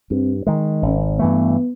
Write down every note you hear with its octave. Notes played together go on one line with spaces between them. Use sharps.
G2 C4
D#3 G#3
G#1 C#4
G2 E3 A3 B3